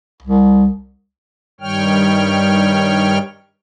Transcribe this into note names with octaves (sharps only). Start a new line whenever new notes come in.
C2
G2 D#3 G3 C#5 G5 F6